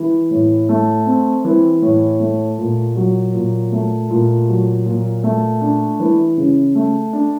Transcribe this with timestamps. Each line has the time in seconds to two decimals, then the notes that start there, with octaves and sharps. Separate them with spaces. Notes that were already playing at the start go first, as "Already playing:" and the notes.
Already playing: E3
0.31 A2
0.69 A3
1.06 C4
1.45 E3
1.82 A2
2.20 A3
2.58 A#2
2.96 F#3
3.33 A#2
3.72 A3
4.10 A#2
4.48 F#3
4.86 A#2
5.24 A3
5.61 D4
6.00 E3
6.37 C#3
6.75 A3
7.13 D4